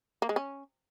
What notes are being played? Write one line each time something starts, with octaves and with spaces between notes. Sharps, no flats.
A#3
G#3
C#4